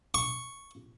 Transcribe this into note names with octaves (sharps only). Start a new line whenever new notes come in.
C#6